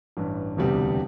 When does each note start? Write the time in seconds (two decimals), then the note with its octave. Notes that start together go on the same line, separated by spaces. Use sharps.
0.17 A1 G2 E3
0.57 E1 D2 C3 G3 B3